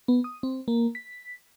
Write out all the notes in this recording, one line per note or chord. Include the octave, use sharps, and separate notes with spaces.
B3
D#6
C4
A#3
B6